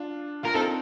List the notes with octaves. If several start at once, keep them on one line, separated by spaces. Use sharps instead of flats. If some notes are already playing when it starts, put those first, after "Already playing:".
Already playing: D4 F4
F4 A#4
C4 D#4 A4